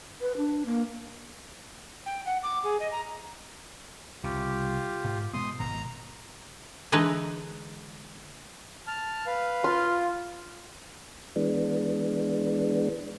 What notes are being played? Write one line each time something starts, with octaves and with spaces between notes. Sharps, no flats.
B4
D4
A#3
G5
F#5
D6
G#4
D#5
A#5
C2 C#3 F4 G4
G#2
B2 G#3 B3 C6 D#6
G#1 F2 B2 A#5
D3 E3 G#3 D#4 B4
A5 F6
B4 F5
F4 C6
E3 G#3 B3 D4